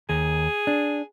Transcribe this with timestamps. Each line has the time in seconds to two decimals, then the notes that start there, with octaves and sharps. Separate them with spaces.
0.09 D#2 G#4
0.67 D4